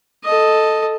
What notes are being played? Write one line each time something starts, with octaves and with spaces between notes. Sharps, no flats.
A4 D#5